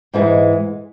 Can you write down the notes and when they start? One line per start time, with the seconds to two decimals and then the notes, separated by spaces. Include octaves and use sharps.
0.14 G#2 E3 G#3